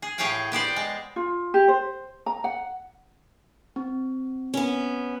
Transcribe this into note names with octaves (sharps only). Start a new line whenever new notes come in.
G#4
A2 G4 G#4 C#5 F5 G5
B3 G4 C5 D5
G#3
F4
G4
C5
A#5
F#5
C4
B3 C#4